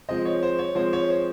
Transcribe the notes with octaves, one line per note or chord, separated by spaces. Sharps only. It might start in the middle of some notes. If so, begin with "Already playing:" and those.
F3 G#3 C4 D#5
C#5
C5
C#5
F3 G#3 C4 C5
C#5
C5